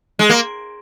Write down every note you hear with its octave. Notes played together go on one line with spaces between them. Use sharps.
G#3
A#3